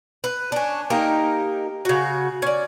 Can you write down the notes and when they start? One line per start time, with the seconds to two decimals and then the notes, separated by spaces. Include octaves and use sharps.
0.24 B4
0.52 C#4 D4
0.90 A#3 D#4 G4 A#4
1.85 C#3 F#4
2.42 C#4 D5